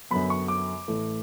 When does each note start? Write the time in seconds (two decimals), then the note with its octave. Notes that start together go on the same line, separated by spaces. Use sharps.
0.11 F#2 D3 F#3 B3 B5
0.30 C#6
0.48 D6
0.88 A1 A2 E3 A3